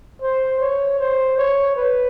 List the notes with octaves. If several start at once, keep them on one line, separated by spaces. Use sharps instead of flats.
C5
C#5
C5
C#5
B4